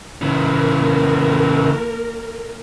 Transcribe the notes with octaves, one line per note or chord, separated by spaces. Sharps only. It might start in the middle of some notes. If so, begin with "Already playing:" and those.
C#3 E3 A#3 A#4